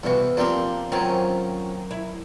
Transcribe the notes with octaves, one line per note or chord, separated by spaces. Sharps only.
E2 G2 C3 E3 F#4
F3 A#3 C4 D4 G4
D#3 F#3 C4 C#4 F4
E4